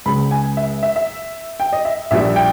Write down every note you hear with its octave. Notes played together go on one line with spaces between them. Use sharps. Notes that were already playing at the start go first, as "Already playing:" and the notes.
C#2 C#3 G#3 B5
G#5
E5
E5
E5
G5
D#5
E5
A#1 A#2 G3 E5
G5